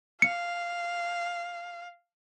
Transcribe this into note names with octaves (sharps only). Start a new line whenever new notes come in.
F5 C#7